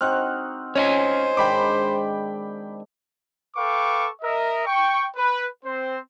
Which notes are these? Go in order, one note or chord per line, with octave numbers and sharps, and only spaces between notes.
C4 D#4 F#4 F6 F#6
C#4 C5 C#5 D#5 G#5
G#2 D#3 D4 G5 B5 D6
A4 B4 F5 G5 C#6 D6
A#4 D#5 E5
G5 C#6
B4
C4 C5